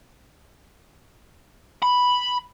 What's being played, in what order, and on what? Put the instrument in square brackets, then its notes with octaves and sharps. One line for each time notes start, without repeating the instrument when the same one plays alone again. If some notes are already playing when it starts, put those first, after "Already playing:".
[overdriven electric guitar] B5